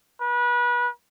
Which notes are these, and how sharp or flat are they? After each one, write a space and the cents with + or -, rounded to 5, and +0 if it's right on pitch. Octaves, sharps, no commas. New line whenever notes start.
B4 -30